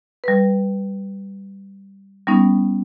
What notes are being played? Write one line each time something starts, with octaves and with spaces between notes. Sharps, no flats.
G3 B4
G3 B3 C#4 D#4